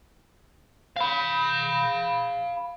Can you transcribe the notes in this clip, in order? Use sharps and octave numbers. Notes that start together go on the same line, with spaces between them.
F5 B5